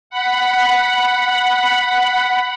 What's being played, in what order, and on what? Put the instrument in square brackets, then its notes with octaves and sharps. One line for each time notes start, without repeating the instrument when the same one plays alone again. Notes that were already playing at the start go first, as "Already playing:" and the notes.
[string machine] F#5 B5